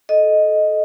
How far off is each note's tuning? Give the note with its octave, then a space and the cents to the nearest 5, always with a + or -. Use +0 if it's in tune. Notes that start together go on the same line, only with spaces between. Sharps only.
A4 -25 D#5 +0